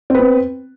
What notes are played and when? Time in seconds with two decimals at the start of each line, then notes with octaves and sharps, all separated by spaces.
0.10 C4
0.15 B4
0.19 B3